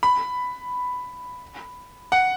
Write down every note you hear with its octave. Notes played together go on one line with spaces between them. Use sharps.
B5
F#5